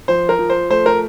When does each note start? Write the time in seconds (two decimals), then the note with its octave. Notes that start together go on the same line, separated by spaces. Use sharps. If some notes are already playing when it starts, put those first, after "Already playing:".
0.08 F3 C5
0.29 A#4
0.39 F3
0.50 C5
0.70 A3 C5
0.86 A#4